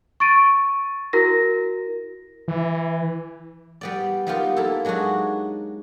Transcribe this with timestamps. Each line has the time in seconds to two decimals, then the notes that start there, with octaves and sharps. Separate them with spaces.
0.20 C#6 A6 D7 D#7
1.13 E4 F#4 A#4 A#6
2.48 E3
3.81 G3 B3 D5
4.27 G3 A#3 B3 D#4 F4 G4
4.56 A#3 E4 A4
4.85 F#3 G#3 D4 D#4 F#4